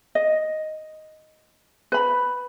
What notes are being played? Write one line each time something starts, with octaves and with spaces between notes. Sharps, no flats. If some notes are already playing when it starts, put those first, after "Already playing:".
D#5
B4 B5